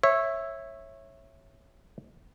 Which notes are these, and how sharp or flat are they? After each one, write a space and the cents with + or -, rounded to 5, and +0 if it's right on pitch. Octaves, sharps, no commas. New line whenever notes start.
C#5 -20 E5 +0